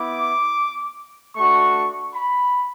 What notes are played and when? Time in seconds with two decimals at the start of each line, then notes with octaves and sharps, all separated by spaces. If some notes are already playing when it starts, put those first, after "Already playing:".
Already playing: B3 E4 D6
1.36 A3 D4 F#4 C#6
2.14 B5